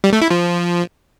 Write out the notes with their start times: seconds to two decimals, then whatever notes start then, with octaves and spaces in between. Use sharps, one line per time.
0.04 G3
0.13 A3
0.22 E4
0.30 F3